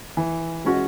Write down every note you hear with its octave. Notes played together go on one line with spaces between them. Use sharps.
E3
G#3 C#4 F#4